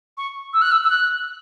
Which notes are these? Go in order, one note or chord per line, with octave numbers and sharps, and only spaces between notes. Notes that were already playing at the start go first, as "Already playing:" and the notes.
C#6
E6
F#6
E6
E6
F#6